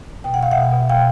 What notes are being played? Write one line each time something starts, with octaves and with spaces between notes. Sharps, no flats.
B2 G5
F#5
B2 F5
E5 F#5
B2
B2
B2 F5 G5